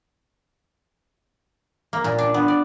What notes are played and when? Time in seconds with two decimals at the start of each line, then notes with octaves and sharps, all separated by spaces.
1.93 A#3
2.04 A#2
2.18 D4
2.34 B3
2.48 D5